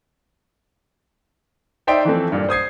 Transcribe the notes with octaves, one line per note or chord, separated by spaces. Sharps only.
D#4 C5 D5 E5 G5 C6
E3 F3 A3 C4
G2 A#2
C5 D#6 G#6 C7